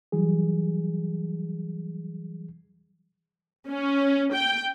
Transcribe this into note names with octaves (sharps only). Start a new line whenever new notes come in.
E3 F#3 G3 G#4
C#4
G5